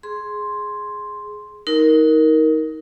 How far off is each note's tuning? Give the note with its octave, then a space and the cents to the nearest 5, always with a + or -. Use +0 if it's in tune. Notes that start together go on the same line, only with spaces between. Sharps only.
G#4 +5 C6 +0
D#4 +25 A#4 +0